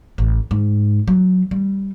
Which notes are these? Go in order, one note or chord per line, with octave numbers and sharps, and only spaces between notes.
A1
G#2
F#3
G3